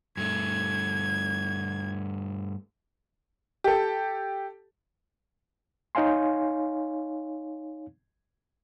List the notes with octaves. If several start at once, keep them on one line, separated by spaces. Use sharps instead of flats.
G2 A3 G#6
G4 A4
D#4 C#5 F5 G#5 C6